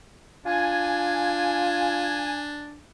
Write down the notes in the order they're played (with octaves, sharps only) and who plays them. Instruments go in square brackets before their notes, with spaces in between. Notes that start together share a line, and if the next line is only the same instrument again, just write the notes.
[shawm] D4 [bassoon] F4 [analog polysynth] G#5